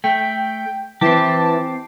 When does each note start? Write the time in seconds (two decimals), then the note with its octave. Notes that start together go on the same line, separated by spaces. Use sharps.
0.04 A3 G5
1.01 E3 C4 G4 A5